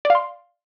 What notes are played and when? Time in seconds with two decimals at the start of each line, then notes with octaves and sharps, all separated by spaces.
0.05 D5
0.10 F5
0.15 C6